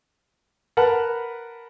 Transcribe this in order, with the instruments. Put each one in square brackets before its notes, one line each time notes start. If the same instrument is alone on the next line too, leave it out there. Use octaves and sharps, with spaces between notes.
[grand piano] A#4 B4 F#5 A5 B5 F#6